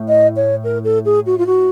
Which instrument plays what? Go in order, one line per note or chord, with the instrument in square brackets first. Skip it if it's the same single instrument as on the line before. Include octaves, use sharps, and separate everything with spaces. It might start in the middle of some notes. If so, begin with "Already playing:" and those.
Already playing: [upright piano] A2
[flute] D#5
C#5
A#4
A4
G#4
F#4
F4
F#4